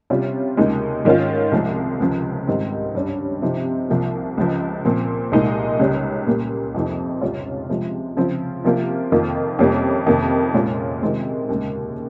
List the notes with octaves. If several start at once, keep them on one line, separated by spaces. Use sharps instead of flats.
C3 G3 C#4 F4
D#2 C#3 G#3 D#4
G#2 D#3 G#3 C#4 F4
C2 C3 F3 G#3
C#2 C#3 F3
G#2 D#3 G3 C4 D#4
G2 G3 C#4
C3 F3 C4 D#4
C2 C3 F3 A#3
C#2 C#3 F3
A#2 F3 C4
C2 A#2 G#3 D#4
C#2 C#3 G3 C#4
A#2 G3 A#3
F2 C3 F3 C4 D#4
C#2 C#3 G3 C#4 F4
C3 F3 G#3
C#3 F3 C4 F4
C3 F3 A#3 F4
F2 D#3 A#3 F4
F2 C3 G3 A#3 C#4
F2 C3 D#3 A#3
A#2 G#3 C#4 F4
C3 D#3 G#3 C4
D#2 C#3 G#3